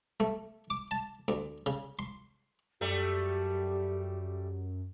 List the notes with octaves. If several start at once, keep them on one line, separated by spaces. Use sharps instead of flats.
A3
D6
A5
D2
C#3
C6
F#2 G3 A3 G4